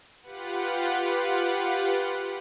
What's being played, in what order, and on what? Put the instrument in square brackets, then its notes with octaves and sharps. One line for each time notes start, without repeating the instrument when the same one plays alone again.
[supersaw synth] F4 G4 B4 F#5